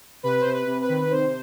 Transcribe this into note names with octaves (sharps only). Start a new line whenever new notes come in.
C3 B4
C3 C5
B4
C3
B4
D#3
C3 C5